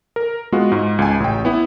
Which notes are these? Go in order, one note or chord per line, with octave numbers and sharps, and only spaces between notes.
A#4
G#3 B3 F4 F#4
G#2
C#2 G#5
A1 G5
B3 E4